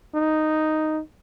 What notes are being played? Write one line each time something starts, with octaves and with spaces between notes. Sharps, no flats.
D#4